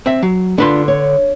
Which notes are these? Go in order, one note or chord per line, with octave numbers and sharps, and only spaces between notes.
C4 E5
F#3
D3 D4 F4 B4 C6
C#5